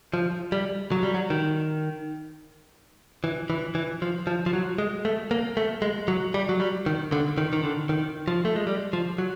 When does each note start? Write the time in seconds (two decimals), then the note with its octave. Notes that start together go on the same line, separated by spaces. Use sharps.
0.14 F3
0.52 G3
0.92 F#3
1.03 G3
1.14 F#3
1.30 D#3
3.24 E3
3.50 E3
3.75 E3
4.02 F3
4.27 F3
4.46 F3
4.53 F#3
4.78 G#3
5.05 A3
5.31 A#3
5.57 A3
5.82 G#3
6.08 F#3
6.34 G3
6.49 F#3
6.60 G3
6.86 D#3
7.12 D3
7.38 D#3
7.53 D#3
7.64 D3
7.89 D#3
8.28 F3
8.45 A3
8.56 G#3
8.67 G3
8.93 F3
9.18 F#3